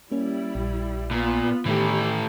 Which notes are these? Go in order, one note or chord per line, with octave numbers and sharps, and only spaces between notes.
G3 A#3 C#4 E4
A#1
A#2 B3 F4
A2 D#3 E3 A3 G4